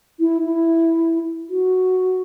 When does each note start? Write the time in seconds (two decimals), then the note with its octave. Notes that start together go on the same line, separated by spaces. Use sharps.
0.19 E4
0.45 E4
1.50 F#4